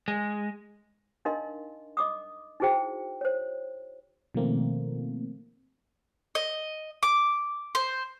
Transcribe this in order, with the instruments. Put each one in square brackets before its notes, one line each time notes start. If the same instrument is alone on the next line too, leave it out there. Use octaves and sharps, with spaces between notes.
[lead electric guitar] G#3
[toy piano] D4 D#4 A#4 D#5 F5 C6
D#5 D6 D#6
D#4 E4 F#4 G#4 C5 G5
C5 C#5
[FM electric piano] B2 D#3 F3 A3 A#3 C4
[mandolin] D#5
D6
C5